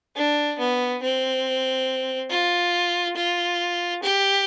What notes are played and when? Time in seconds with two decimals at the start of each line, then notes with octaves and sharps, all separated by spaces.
0.16 D4
0.59 B3
1.03 C4
2.31 F4
3.16 F4
4.03 G4